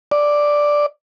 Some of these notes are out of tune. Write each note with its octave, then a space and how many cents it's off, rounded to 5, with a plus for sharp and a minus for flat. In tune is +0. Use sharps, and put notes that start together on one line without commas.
D5 +0